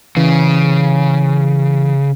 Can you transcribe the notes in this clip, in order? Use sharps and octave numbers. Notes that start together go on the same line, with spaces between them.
C#3 E3